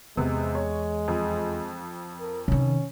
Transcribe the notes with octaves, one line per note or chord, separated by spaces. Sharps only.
E2 C3 G#3 B3
C#5
F2
A#4
C3 D#3 C#4